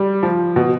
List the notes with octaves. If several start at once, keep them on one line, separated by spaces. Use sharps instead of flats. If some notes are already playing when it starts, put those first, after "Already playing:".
Already playing: G3
F3
B2